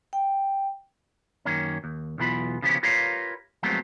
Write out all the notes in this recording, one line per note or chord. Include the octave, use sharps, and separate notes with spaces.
G5
F#2 D#3 A#3 C#4
D#2
B1 E2 E3 B3 F4 B5
C#3 F3 B3 C#4 G4
F4 G4 A#4 B4 C#5 F5
F3 F#3 G#3 A3 B3 C4